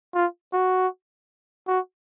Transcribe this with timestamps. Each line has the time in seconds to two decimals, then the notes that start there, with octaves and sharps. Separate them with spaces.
0.14 F4
0.53 F#4
1.68 F#4